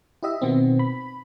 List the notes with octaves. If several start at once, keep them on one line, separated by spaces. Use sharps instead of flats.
E4 G4 D#5 E5
B2 D#3 B3 C4
B5